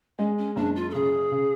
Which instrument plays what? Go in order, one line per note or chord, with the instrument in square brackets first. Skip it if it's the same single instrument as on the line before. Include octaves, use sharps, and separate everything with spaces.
[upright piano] G#3 [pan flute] C#4
[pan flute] C#4
[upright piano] F#1 [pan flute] D4
[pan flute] F4
A4
[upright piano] C#3 [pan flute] G#4
[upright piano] C#3